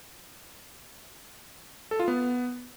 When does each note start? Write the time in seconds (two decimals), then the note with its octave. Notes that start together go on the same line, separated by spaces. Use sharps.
1.91 A4
1.99 F4
2.08 B3